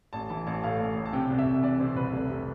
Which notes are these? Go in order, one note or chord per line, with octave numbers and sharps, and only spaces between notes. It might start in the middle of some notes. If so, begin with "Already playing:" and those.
A1 A5
E3 A5
A1 A5
A2 F5
A1
A1
A5
C3 G5
C2
E5
C2
E3 D5
C3 C5
C2 B4
F1
C3